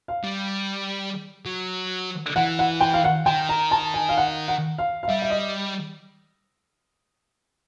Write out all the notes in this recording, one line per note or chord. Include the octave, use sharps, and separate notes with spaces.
F5
G3
F#3
E3 F#5
F#5
G5
F5
F#5
D#3 G5
A#5
A5
G#5
F5
F#5
F#5
F5
F5
G3 E5
E5
D#5